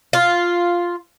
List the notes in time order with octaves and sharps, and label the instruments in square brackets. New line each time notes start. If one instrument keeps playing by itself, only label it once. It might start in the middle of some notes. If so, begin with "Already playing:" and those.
[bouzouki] F4